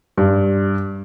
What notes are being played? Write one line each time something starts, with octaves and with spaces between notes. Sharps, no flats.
G2